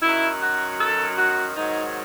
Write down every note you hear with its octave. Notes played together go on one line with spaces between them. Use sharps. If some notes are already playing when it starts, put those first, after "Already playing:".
F#2 D#3 F#3 E4
F#4
A4
F#4
G#2 D#3 F#3 D#4